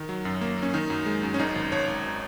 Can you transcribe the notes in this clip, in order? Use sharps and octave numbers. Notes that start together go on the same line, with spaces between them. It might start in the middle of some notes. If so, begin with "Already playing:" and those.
Already playing: D#3
F#3
F#2
A#3
A#3 C#4
D#3 D#4
F#2
G#3
F#2
C#4
G#1 D#4
G#1
G#1 C#5
G#1